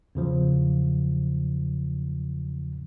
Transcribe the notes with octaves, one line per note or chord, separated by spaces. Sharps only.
E2 C#3 F3 F#3